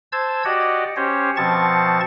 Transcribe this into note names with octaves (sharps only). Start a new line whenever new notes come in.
C5 A5 E6 G#6
F#4 G4 D5 D#5 F#5
C#4 G4 C5 C#5
B2 F3 C4 A5 C#6 A6